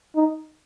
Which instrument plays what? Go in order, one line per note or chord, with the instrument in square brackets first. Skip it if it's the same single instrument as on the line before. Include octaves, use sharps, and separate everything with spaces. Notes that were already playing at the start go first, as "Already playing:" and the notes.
[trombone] D#4